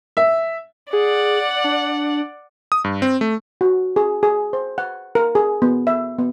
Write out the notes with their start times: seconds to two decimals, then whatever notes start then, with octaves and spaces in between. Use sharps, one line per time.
0.17 E5
0.93 G#4 D5 F#5
1.64 D4
2.72 D#6
2.84 G2
3.02 C4
3.21 A3
3.61 F#4
3.96 G#4
4.23 G#4
4.53 C5
4.78 F#5
5.15 A#4
5.35 G#4
5.62 B3
5.87 E5
6.18 B3